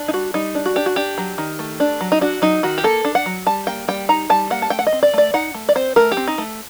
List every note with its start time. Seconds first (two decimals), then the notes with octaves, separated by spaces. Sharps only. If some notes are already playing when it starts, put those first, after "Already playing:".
Already playing: D4
0.08 D#4
0.13 G3 F#4
0.34 G3 D#4
0.55 D4
0.66 F#4
0.76 D4 G4
0.86 F#4
0.96 D4 G4
1.18 F#3
1.38 D#3
1.59 A3
1.80 D4
2.01 F#3
2.12 D#4
2.21 D4 F#4
2.42 F#3 D#4
2.63 D#3 F#4
2.78 G4
2.84 A#3 A4
3.05 D4
3.15 F#5
3.26 F#3
3.46 G3 A5
3.67 A#3 G5
3.88 G3 G5
4.09 D#4 A#5
4.30 G3 A5
4.50 A#3 F#5
4.62 A5
4.70 A3 G5
4.79 F#5
4.87 D#5
4.92 C4
5.03 D5
5.14 A3 D5
5.34 D#4 F#5
5.54 A3
5.69 D5
5.75 C4 C5
5.96 A3 A#4
6.12 G4
6.17 C4
6.28 D#4
6.38 A3